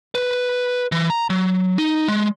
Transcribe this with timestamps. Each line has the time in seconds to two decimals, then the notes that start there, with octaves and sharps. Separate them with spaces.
0.15 B4
0.92 E3
1.10 A#5
1.30 F#3
1.78 D#4
2.08 G#3